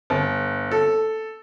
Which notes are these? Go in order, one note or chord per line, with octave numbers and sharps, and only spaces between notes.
G1
A4